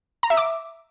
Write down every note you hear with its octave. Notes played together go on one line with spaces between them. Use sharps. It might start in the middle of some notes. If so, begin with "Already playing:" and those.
A#5
E5
D6